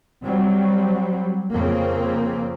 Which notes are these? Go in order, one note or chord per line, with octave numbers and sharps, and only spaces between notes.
F#3 G3 C4
F2 C#3 A#3 C4